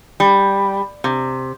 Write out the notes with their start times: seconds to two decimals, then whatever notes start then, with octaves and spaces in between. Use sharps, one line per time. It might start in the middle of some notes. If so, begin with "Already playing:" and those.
0.20 G3
1.04 C3